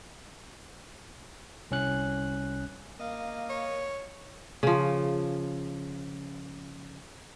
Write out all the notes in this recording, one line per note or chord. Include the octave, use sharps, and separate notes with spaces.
C2 C#4 F#6
A#3 D#5 F5
C#5
C#3 F3